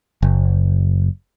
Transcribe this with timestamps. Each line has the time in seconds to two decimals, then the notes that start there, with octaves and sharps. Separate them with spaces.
0.22 F#1